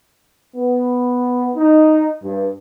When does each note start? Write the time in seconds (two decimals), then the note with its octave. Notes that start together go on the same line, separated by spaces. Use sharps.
0.56 B3
1.56 D#4
2.23 G2